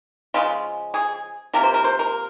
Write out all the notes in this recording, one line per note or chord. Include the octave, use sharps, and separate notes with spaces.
C#3 F3 G#3 F4
G#4
C3 F3 A#3 A#4
C5
A#4
C5
A#4